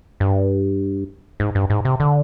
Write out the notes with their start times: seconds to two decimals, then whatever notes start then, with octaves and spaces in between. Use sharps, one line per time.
0.20 G2
1.40 G#2
1.55 G2
1.70 G#2
1.85 C3
2.00 D3